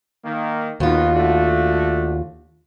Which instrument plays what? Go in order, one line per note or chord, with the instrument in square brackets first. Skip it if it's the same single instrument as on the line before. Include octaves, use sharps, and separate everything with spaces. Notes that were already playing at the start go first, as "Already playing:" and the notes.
[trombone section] D#3 A#3
[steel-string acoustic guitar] D#2 F4 [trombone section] D#3 B3 F#4
[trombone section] A3 D4 F#4